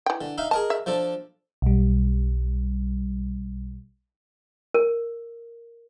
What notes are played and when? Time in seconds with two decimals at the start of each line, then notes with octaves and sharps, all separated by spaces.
0.06 E3 G5
0.21 D3
0.38 D#4 E5 F5
0.51 G#4 A#4 D#5 A5
0.70 E5
0.86 F3 D4 A4
1.62 B1 G3
4.74 A#4